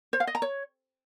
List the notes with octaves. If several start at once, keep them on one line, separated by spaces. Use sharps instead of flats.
C5
F5
D#5
A#5
C#5